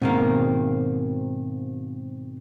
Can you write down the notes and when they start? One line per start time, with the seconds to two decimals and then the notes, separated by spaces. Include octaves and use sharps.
0.02 G#2 B2 D#3 A#3 C4